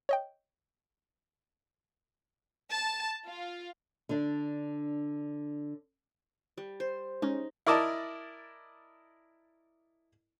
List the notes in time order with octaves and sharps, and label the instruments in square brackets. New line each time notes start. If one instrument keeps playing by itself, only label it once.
[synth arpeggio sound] C#5 D#5 G5
[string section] A5
F4
[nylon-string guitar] D3 D4
[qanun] G3
C5
[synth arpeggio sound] G#3 C#4 [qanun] D#4
[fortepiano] E4 A#4 D5 D#5 A5